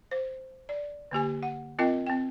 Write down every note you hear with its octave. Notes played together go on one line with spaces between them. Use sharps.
C5
D5
D3 A#3 G4 G#5
F#5
C4 F4 A#4 D#5 G5
C4 G5